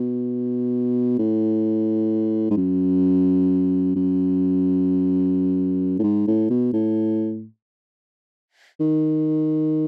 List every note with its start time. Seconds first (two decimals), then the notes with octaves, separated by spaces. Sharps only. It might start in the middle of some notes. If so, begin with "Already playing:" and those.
Already playing: B2
1.19 A2
2.50 G#2
2.57 F#2
3.96 F#2
5.99 A2
6.03 G#2
6.27 A2
6.50 B2
6.73 A2
8.80 D#3